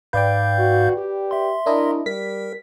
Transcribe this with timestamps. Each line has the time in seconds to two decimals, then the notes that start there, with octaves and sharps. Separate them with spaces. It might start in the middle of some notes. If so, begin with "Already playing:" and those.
0.13 G#2 B4 D5 F5 G5 G6
0.59 F#4
0.97 G4
1.31 E5 C6
1.66 D4 E4 A#4 D#5
2.06 G3 A#4 B6